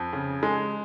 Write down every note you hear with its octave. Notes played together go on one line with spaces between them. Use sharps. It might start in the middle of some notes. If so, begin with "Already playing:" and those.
Already playing: F2
C#3
G#3